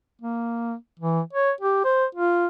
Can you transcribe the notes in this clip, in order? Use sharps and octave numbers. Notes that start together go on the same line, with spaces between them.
A#3
E3
C#5
G4
C5
F4